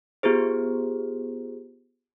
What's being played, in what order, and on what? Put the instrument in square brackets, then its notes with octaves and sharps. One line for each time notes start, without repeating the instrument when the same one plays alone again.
[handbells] B3 F4 G4 G#4 C5